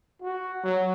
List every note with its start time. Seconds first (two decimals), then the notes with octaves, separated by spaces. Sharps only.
0.22 F#4
0.64 F#3